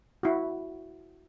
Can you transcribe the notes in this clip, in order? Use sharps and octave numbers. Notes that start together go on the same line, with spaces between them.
E4 F#4